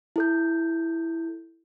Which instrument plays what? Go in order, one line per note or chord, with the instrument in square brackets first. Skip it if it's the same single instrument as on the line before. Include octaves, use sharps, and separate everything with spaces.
[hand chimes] E4 A4 G6